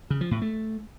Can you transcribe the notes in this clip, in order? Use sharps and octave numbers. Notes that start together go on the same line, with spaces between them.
C#3
F3
A2
A3